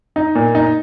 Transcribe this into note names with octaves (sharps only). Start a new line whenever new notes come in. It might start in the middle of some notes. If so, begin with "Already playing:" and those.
D#4
A#2
D#4